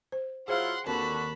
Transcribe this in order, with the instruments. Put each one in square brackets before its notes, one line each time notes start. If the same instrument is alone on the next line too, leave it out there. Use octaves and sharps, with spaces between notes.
[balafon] C5
[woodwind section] F#3 E4 F4 [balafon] G#4 C5 F5 [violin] F#5 C6
[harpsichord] D#2 [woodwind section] D3 F#4 [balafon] D#3 C4 [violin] A5 B5